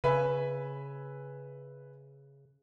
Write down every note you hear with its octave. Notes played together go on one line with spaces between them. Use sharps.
C#3 B4 E5 G#5